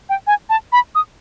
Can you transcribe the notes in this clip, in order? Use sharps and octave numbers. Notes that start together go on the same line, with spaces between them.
G5
G#5
A5
B5
D#6